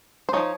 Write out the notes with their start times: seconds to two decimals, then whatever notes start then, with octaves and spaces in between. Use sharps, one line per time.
0.29 C5
0.33 F3 A3 D#4 C#5